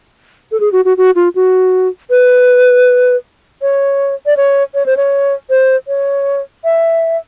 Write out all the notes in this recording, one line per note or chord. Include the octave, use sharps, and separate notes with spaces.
A4
G#4
F#4
F#4
F#4
F4
F#4
B4
C#5
D5
C#5
C#5
C5
C#5
C5
C#5
E5